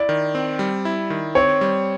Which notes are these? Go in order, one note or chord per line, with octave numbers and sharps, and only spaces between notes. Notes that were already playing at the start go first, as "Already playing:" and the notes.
Already playing: E4 D5
D#3
C4
G3
E4
D#3
C4 C#5
G3